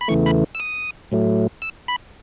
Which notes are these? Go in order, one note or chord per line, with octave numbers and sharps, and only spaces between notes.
B5
E2 C#3 E3 A3 C#6
B5
E6
D#6
A2 F#3 A3
E6
B5